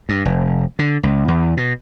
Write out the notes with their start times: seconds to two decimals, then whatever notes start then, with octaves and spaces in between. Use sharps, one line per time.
0.09 G2
0.25 F1
0.79 D3
1.03 C#2
1.28 E2
1.57 B2